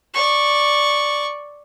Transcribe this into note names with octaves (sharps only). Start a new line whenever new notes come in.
D5 C#6